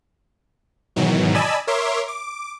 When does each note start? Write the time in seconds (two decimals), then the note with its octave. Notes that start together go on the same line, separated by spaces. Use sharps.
0.96 G#2 B2 D#3 E3 F#3
1.34 D5 D#5 G#5 A5 B5 E6
1.67 A#4 C#5 E5 C6 D6
2.08 D6